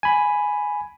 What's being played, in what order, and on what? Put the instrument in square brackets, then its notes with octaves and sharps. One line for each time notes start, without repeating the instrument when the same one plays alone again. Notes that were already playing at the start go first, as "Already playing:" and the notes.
[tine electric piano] G#5 B5